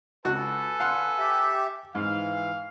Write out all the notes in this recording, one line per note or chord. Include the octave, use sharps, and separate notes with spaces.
C#2 F#4 A4 B4 G#5 F#6
D3 F5 F#5 C6
G4 E5
G#2 E3 F5